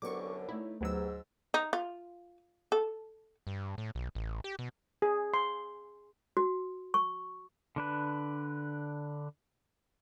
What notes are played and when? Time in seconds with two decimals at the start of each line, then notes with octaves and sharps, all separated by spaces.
0.02 C2 F#2 D3 F#3 B3 C4 C#6 D6
0.49 A3 D#4 E4 C#5
0.81 D2 G#2 F#3 B3 G4 E6
1.54 D#4
1.73 F4
2.72 A4
3.47 G2
3.78 A2
3.95 B1
4.15 A1
4.44 G4
4.59 B2
5.02 G#4
5.34 C6
6.37 F#4
6.94 C#6
7.76 D3 D4 B4